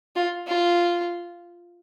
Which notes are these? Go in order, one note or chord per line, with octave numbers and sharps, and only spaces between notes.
F4
F4